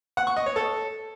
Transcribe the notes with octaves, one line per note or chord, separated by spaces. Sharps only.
F#5
C#6
D#5
C#5
A4